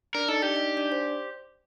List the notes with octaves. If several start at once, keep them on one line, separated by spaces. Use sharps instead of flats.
D4 A#4 D5
D#4 A4 D#5
D4 G4 D5
D#4 D#5
D4 D5
C5